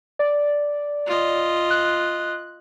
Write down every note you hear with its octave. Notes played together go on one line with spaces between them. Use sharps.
D5
F4 D#5
F#6